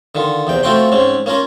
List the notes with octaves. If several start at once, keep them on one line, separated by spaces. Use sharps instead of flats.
D3 D#3 F4
E2 C3 G5
A3 C4 F4 F#4 G5 C6
G#2 C4 C#4
A#3 C#4 F4 A#4